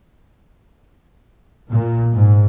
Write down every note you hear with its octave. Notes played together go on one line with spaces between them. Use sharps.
A#2
G#2